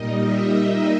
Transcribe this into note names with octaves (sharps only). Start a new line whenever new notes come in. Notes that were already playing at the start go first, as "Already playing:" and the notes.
Already playing: A#2 G3 A#3 D#4 D#5
E5